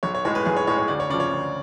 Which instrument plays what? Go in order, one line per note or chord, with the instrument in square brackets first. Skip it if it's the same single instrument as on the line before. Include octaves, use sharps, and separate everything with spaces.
[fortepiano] B1 [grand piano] C#5
[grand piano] C#5
[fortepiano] A2 G#3 [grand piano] C#5
[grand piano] B4
[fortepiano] B1 [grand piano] G#4
[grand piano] C#5
[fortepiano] A2 G#3 [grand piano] C#5
[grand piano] C#5
[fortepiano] D2 [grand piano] D5
[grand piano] C#5
[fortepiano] C#3 F3 [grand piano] D5
[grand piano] C#5
[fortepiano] D2